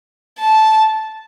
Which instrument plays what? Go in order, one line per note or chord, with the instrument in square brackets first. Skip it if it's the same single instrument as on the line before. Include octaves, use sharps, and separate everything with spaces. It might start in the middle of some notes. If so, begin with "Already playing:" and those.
[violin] A5